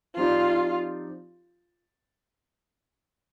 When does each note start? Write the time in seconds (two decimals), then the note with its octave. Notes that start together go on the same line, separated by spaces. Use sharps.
0.16 F3 C4 D#4 F4 G4 D5